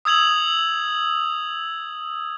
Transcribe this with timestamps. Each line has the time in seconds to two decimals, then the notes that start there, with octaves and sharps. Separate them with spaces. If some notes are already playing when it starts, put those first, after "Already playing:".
0.05 D#6 E6 G#6 F7 F#7